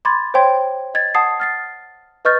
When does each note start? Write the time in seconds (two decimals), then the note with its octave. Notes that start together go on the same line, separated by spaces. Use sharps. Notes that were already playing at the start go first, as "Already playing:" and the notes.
0.05 B5 C6 D6 G#6 A6
0.34 C5 C#5 G5 C6 G#6
0.94 D#5 G#6 A6
1.15 F#5 A5 D#6 C7
1.40 F6 A6 C7
2.25 B4 D#5 C#6 F6 G6 A6